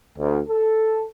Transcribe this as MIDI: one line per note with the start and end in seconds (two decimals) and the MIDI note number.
0.18 0.40 38
0.49 1.05 69